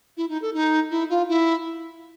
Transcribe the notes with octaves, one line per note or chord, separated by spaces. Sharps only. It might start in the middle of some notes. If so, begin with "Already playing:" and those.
E4
D#4
A4
D#4
E4
F4
E4